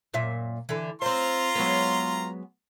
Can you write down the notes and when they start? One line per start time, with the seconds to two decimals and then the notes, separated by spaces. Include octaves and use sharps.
0.13 F#2 A#2 E5
0.69 D3 E3
1.02 C4 F4 C5 A#5 C6
1.55 F#3 G#3 B3